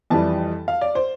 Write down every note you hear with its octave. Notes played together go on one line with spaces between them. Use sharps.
F2 E3 G3 A5
F5
D5
C5